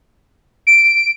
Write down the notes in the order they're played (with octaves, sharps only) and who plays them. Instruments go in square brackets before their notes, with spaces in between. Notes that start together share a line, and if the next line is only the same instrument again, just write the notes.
[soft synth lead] D7